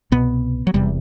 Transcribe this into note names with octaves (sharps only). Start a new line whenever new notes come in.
C2 B2 B3
F#3
E1 E2 C3 G3